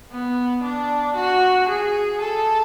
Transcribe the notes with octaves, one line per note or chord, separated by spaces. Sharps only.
B3
D4
F#4
G#4
A4